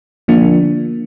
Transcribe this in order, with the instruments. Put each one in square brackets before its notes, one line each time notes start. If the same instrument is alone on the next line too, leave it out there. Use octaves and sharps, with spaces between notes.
[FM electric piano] D3 F3 A#3 D4